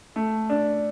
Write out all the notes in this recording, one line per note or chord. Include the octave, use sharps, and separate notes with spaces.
A3
D4